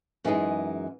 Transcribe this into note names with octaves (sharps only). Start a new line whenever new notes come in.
F#2 E3 G#3 D#4 G#4